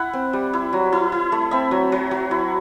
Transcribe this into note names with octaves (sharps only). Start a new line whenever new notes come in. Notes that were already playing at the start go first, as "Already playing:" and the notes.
Already playing: E4 F#5
C4
G3
E4
F#3
E4
E4
A3
C4 E5
F#3
F#3
F#3
E4